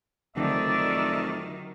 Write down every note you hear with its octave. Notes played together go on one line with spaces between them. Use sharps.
F1 D3 D#3 F#3 C4 D5 E5 D6